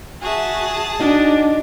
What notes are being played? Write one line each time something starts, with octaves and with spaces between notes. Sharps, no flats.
F#4 G#4 E5 A5
D4 D#4 F#4 D#5